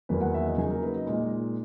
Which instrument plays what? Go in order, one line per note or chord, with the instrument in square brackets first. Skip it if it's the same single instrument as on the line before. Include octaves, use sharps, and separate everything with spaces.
[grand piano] E2 D#3 F#3 A#3 B4
F#5
E5
D#5
C#3 F#3 A#3 D#4 G#4
A#4
B4
D#5
A#2 G#3 D#4